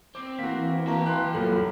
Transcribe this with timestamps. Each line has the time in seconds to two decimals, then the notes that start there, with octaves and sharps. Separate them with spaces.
0.15 C4 D6
0.39 E3 A#3 F#4 B6
0.87 A#3 F#4 G5 A5 A#5
1.06 C6 F#6
1.34 C2 F#2 A#3 F4 A4